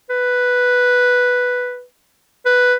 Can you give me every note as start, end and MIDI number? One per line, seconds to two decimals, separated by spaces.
0.10 1.84 71
2.45 2.76 71